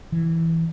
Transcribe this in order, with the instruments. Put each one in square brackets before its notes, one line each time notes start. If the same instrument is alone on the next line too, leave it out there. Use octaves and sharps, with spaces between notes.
[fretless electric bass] E3